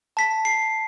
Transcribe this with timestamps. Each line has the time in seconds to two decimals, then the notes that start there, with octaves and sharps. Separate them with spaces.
0.17 A5 B6
0.45 C7